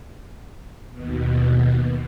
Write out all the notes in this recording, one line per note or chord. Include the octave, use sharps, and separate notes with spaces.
D#2 B2